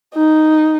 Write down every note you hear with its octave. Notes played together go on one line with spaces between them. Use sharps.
D#4